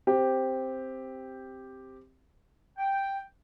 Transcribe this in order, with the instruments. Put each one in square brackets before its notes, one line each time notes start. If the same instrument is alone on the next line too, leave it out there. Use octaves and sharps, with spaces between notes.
[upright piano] C4 G4
[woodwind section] G5